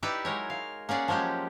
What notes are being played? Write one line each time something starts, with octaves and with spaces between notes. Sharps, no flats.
D#4 E4 G4 B4 D5 E5
F#3 G#3 A#4 C#5
F5
A#3 C#4 G#4 D5 F#5
F3 F#3 G#3 C#4 G4